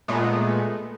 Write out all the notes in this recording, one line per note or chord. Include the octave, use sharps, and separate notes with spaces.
A#2 G#3 A3 B3